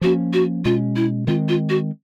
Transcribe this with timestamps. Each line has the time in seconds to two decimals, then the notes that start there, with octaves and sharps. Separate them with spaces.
0.01 F3 A#3 C#4 F#4
0.33 F#4
0.65 B2 G#3 C#4 F4
0.96 E4
1.27 D#3 G#3 C4 F4
1.48 F4
1.69 F#4